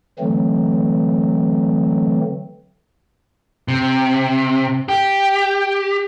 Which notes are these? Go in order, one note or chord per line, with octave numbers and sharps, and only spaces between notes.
D3 E3 F#3 A3 C4
C3
G4